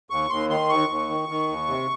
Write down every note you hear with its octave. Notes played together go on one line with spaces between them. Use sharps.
D#2 C#6
D#2 C6
D#3 C6
D#2 C#6
D#2
D#3
D#3
D#2
C3